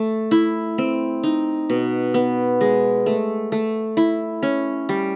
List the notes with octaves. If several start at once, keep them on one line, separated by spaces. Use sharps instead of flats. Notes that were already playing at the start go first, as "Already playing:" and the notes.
Already playing: A3
E4
C4
D#4
B2
B3
G#3
A3
A3
E4
C#4
G3